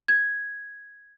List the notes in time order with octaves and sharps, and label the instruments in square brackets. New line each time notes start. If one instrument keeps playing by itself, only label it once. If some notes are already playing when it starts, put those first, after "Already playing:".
[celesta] G#6